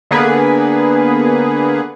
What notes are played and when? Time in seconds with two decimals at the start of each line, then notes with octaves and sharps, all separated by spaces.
0.11 D3 A#3 B3 G#4 B4